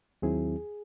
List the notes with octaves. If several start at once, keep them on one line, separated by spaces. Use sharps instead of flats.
D#2 D#3 F#3 C4 E4 G#4